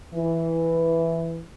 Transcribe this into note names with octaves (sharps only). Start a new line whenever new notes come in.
E3